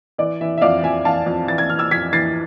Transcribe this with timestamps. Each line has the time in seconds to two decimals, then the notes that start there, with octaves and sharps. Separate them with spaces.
0.18 E3 D5
0.41 E3 E5
0.58 E5
0.61 F2 D5 F5
0.83 F2 E5 G#5
1.05 E3 F5 A5
1.26 F2
1.48 E3 A6
1.58 G#6
1.70 E3 F6
1.79 E6 G#6
1.91 F2 G#6 B6
2.13 E3 A6 C7